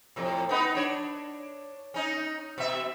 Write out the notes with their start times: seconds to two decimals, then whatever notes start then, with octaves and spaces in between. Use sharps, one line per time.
0.16 F2 A2 C3
0.49 B3 D#4 B4
0.75 D4 C#5
1.94 C#4 D#4
2.58 B2 E5